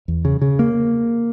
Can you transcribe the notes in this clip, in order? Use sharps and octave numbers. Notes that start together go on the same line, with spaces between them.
E2
C#3
C#3
A#3